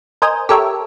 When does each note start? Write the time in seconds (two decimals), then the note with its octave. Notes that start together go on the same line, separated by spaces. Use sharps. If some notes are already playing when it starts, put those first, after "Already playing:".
0.22 A#4 C5 D#5 G#5
0.49 G4 A4 A#4 C#5 E5